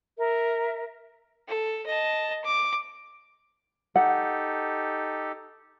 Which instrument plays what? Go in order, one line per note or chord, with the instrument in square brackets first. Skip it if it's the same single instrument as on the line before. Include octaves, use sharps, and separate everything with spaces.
[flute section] A#4 E5
[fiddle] A4
D#5 A5
D6
[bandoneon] D#4 G4 A4 [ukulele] F#5